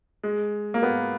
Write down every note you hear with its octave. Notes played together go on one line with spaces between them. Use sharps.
G#3
A#3
B3